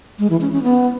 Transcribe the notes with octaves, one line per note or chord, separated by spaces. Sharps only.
G#3
E3
C#4
C#4
B3